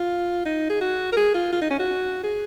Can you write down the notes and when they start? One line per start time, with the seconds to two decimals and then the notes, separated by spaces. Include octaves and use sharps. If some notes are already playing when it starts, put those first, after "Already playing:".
Already playing: F4
0.46 D#4
0.70 G#4
0.81 F#4
1.12 A#4
1.17 G#4
1.35 F4
1.53 F4
1.61 D#4
1.70 C#4
1.79 F#4
2.23 G#4